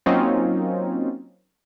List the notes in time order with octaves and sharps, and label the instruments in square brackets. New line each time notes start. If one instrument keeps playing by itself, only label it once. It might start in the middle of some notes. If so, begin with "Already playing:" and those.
[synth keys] F#3 A#3 C4 C#4 D#4 F4